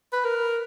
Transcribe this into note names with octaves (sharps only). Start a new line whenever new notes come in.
B4
A#4